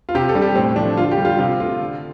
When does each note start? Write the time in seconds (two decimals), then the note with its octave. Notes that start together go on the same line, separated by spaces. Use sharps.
0.09 F4
0.15 C3 G4
0.29 A4
0.35 G3
0.42 G4
0.55 A2 C4
0.76 F3 A3 D4
0.97 D3 F4
1.11 G4
1.18 G3
1.25 F4
1.38 C3 F4
1.60 A3 F4
1.81 D3